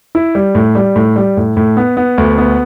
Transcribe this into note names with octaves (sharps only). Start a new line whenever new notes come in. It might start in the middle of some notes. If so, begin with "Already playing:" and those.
E4
G3
A2
G3
A2
G3
A2
A2
B3
B3
D2
B3